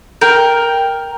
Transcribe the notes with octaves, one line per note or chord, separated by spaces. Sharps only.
A#4 G5